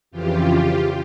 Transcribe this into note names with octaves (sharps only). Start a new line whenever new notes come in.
F2 C#3 E3 F4 G4